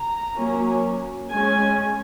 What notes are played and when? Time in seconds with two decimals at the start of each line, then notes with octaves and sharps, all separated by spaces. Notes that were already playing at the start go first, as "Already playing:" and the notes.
Already playing: A#5
0.37 F#3 A#3 C#4
1.31 G#3 C#4 G#5